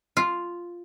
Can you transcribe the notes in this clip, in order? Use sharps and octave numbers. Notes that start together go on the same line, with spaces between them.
F4